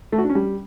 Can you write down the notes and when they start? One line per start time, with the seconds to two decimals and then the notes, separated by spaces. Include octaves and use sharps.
0.12 A3
0.18 F#4
0.24 D4
0.30 C#4
0.35 G3